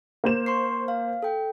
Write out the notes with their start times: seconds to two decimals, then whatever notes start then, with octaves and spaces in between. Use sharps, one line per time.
0.24 A#3 C5 E7
0.46 C6 C#6 C7
0.88 F5
1.23 A4 G5